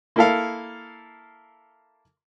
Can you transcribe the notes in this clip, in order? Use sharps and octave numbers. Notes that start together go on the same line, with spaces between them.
A#3 E4 A4 F5